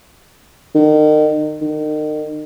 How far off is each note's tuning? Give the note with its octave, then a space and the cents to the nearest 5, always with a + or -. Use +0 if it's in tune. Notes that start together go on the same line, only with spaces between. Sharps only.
D#3 -35
D#3 -35